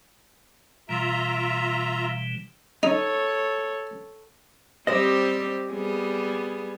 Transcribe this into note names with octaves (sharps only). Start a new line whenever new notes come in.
B2 E3 G3 F4 E5 A#5
D#4 A4 C#5
G3 C4 G4 C5 D#5
G3 B3 G#4